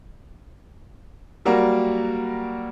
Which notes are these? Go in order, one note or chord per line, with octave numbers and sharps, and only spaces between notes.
F#3 G3 A#3 F#4 A#4